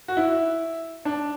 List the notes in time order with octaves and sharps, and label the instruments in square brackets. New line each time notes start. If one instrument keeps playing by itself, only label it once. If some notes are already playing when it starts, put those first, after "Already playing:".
[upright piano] F#4
E4
D4